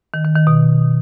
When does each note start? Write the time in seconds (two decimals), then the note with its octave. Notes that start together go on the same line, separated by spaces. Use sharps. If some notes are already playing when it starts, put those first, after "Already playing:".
0.14 D#3
0.25 D#3
0.36 D#3
0.47 B2